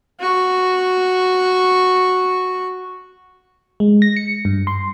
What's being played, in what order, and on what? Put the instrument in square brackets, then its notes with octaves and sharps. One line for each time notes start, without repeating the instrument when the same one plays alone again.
[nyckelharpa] F#4 C#6
[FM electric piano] G#3
A#6
C#7
G2
C6